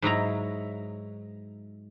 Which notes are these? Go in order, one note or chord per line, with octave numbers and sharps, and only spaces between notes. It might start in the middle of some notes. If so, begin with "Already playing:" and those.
G#2 F#3 E4 A#5